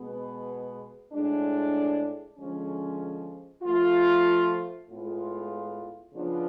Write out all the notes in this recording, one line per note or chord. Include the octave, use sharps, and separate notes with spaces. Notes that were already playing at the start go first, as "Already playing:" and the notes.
Already playing: B2 G#3 B3
A2 G#3 D4
D3 F3 G#3 C#4
F3 A3 F4
A2 G#3 B3 F4
C#3 F3 B3 D4 F4